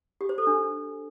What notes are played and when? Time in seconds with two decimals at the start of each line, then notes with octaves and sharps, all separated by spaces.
0.21 G4
0.29 C5
0.38 A4
0.47 D4